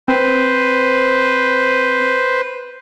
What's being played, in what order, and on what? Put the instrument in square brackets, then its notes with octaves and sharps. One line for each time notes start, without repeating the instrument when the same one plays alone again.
[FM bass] C4 [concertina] B4 C5